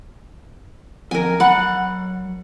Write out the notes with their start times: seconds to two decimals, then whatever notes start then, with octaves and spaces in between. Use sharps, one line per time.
1.11 F2 A#4 G#5
1.40 F#3 F#5 B5